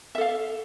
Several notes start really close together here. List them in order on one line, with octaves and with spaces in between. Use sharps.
E5 A4 F5